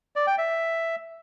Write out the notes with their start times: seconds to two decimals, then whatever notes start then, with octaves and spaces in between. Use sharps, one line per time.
0.16 D5
0.27 G5
0.38 E5